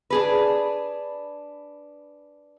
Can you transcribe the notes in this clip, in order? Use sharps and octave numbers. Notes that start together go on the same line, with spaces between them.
D4 G#4 B4